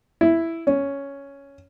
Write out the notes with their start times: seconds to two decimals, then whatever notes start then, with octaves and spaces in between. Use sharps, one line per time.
0.21 E4
0.67 C#4